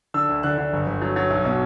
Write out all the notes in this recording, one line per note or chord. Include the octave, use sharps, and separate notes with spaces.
D3 E6
D2
D3 F#6
D3
G1
G1
F#3
F#3
B1
B2